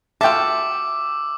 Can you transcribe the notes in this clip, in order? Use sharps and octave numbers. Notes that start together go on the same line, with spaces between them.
F4 F#4 A4 E5 G5 D6 E6